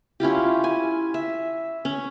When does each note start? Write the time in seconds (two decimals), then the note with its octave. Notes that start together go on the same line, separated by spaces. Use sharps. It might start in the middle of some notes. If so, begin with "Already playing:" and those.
0.20 C#4 E4 F4 G4
0.64 G#5
1.14 E5
1.85 C#4